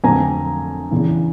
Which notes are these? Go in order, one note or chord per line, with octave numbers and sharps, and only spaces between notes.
F2 D3 F#3 A3 C4 G#5 A#5
E2 C#3 E3